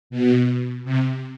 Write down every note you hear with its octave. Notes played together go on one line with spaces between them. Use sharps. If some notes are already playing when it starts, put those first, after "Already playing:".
B2
C3